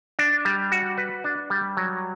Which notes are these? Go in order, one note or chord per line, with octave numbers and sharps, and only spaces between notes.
D4
G3
F#4
B4
D4
G3
F#3